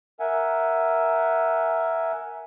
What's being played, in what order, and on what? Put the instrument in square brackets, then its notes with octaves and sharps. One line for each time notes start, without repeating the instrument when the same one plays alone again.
[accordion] A#4 E5 F#5 G#5